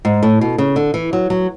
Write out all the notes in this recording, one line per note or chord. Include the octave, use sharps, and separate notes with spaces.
G#2
A2
B2
C#3
D3
E3
F#3
F#3